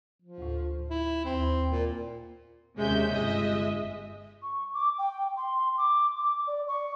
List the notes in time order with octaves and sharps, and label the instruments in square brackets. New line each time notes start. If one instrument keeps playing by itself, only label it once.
[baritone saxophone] F3
[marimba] D2 A2
[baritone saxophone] E4
[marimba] D#2 [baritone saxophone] C4
[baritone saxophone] A#2
[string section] D#2 C3 G#3 C#4 E5 G6
G1 G#3 D#5 E5
[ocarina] C#6
D6
G5
C6
D6
D6
D5
C#6